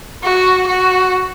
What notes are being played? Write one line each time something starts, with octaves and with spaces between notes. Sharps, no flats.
F#4
F#4